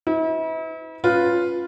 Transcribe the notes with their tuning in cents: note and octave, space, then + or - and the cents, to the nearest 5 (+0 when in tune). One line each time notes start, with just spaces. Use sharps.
E4 -40 B4 +45
C#4 +0 F4 +0 B4 +0